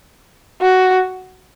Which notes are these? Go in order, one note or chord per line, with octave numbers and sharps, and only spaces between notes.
F#4